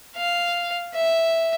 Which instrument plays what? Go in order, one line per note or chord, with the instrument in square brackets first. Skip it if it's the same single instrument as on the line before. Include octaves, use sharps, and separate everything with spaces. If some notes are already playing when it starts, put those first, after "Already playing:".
[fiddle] F5
E5